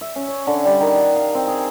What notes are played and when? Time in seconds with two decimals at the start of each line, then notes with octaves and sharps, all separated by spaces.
0.01 E5
0.16 C#4
0.28 C#5
0.47 D3
0.65 G3
0.80 D#3
0.96 F#5
1.16 F5
1.35 C4
1.47 G#4